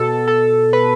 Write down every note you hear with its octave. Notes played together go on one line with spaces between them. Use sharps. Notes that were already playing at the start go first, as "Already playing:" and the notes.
Already playing: B2 A4
A4
B4